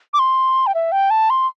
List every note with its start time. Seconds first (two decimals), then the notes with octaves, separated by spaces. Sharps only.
0.14 D6
0.19 C6
0.67 G5
0.75 E5
0.92 G5
1.10 A5
1.30 C6